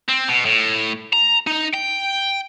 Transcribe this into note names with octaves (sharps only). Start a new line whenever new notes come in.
C4
B2
A2
A#5
D#4
G5